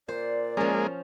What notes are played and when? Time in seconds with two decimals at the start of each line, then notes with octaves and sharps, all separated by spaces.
0.08 A#2 C5 D5
0.57 F3 G#3 A#3 C#4